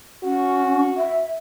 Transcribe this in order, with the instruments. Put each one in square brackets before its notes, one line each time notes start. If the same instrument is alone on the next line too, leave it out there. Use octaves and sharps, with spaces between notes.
[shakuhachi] C#4 [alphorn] F#4
[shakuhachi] E5